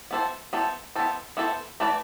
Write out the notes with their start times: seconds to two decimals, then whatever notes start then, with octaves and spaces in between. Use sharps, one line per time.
0.11 B3 E4 A4 C5
0.53 B3 E4 A4 C5
0.95 B3 E4 A4 C5
1.37 B3 E4 A4 C5
1.80 E3 A3 E4 B4 D5